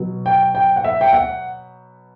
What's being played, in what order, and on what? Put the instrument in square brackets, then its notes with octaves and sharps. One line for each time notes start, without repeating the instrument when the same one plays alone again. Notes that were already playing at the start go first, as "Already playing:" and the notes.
Already playing: [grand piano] B2 F#3
G5
G5
F#5
E5
G5
F#5